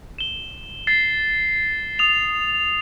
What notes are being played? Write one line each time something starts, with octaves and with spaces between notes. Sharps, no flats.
E7 G7
A6 C7
D#6 F7